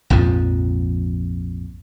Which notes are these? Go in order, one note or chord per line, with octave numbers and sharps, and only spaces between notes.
A#1 F2 G#2 F3